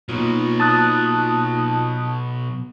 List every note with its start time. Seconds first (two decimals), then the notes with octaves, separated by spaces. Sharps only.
0.09 B2 F#3 A#3 D#4 F4
0.60 A5 D#6 F#6